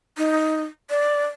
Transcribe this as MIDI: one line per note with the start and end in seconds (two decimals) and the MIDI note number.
0.18 0.64 63
0.90 1.26 74